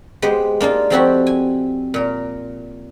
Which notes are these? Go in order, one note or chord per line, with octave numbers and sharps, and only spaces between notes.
G#3 B3 G4 C5
A#3 D4 D#4 F4
F3 A3 C4 E4 F#4 G4
G#5
A#2 A#4